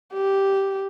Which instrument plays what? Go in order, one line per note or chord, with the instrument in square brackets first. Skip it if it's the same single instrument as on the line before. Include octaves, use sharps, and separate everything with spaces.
[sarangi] G4